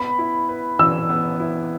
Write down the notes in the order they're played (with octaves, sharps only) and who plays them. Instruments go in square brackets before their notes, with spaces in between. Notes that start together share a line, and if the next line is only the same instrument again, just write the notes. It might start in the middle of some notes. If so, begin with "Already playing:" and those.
Already playing: [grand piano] B3 [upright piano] B5
[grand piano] E4
B4
[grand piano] E3 [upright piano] E6
[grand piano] B3
E4